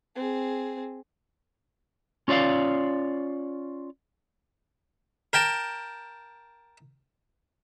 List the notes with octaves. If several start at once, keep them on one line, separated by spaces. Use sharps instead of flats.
C4 G#4
C#4 F4 C#5 D5 F5
A#4 G5 A5